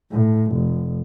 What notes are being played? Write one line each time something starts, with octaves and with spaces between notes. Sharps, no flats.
A2
F1